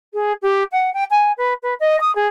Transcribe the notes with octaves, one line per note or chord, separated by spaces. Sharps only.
G#4
G4
F#5
G5
G#5
B4
B4
D#5
D#6
G#4